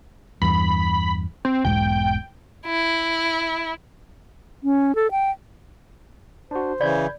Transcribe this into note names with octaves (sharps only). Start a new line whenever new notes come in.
E2 G2 B5
C4
E1 B1 G#2 G5
E4
C#4
A4
G5
D4 F#4 C5
C#3 E3 D5 B5 G6 G#6